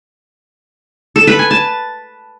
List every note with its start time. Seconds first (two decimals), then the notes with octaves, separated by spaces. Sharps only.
1.16 A4
1.27 B4
1.39 G#5
1.51 A5